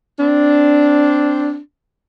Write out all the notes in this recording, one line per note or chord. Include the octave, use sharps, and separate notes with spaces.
C4 D4